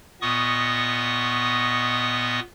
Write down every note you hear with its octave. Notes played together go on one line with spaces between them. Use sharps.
A#2 B3 D#5 C#6 D#6